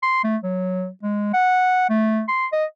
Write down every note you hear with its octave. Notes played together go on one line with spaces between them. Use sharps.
C6
A3
F#3
G#3
F#5
A3
C6
D#5